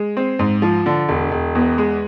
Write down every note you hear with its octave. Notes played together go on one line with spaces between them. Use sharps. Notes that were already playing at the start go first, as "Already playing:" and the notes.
Already playing: G#3
C4
G#2
F3
D3
E1
E1
E2
G#3